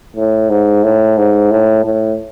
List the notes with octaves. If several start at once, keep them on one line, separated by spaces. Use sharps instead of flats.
A2
G#2
A2
G#2
A2
A2